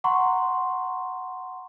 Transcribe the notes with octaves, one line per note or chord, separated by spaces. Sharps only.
F#5 A#5 C6 C#6